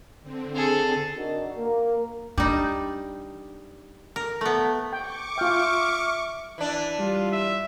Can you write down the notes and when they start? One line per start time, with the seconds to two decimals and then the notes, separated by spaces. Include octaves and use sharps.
0.23 D3 C4
0.55 G#4 A4
1.17 D4 D#4 F#4 A#4
1.56 A#3 A#4
2.38 G3 D4 D#4
4.16 A#4
4.41 A3 B3
4.93 G5 C#6 D6
5.38 F4 E5 G5 F6
6.58 E3 D4
6.99 G3 F4
7.32 E5